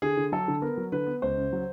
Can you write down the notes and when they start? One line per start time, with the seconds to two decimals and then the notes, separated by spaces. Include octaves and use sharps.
0.02 D3 G#4
0.17 D3
0.32 F#3 A4
0.48 D3
0.62 B3 A#4
0.77 F#3
0.92 D3 B4
1.07 B3
1.22 C#2 C5
1.38 C#3
1.53 F#3